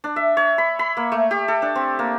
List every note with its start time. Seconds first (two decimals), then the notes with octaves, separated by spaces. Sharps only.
0.04 D4
0.16 E5
0.37 C#5
0.58 B5
0.79 B5
0.97 A#3
1.12 A3
1.31 G4
1.48 A4
1.62 D4
1.76 C4
1.99 A#3